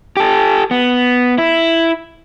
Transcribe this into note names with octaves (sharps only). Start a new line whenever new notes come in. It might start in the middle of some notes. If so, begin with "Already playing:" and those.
G4 A4
B3
E4